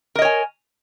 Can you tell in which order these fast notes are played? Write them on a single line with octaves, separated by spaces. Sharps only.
A#4 D#5 C#5 G#5